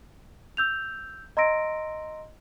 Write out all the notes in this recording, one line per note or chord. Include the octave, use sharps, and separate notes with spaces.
E6 G6 F7
D#5 A#5 C6 E6 A#6 D7